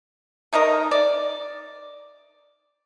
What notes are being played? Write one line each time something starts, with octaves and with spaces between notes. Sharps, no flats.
A3 D#4 A#4 D#5
D5